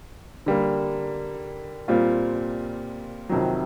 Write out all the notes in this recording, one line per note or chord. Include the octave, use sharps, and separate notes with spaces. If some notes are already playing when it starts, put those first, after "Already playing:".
D3 G3 A#3
A#2 G3 C4 F4
F2 C3 D#3 F#3